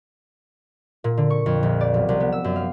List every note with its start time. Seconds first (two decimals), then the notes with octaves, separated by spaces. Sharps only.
1.04 A#2
1.17 D3
1.30 C#6
1.46 F2
1.63 A#1
1.81 D5
1.94 B1
2.09 C2
2.20 B3
2.32 E6
2.44 F#2
2.56 F5